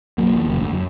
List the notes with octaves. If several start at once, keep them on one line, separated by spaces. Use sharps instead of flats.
B1 F#3 A#3
E2 G2 A#2
F#1 F#2
D2
F#2